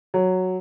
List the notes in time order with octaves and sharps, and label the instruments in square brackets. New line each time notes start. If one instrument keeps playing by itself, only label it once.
[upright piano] F#3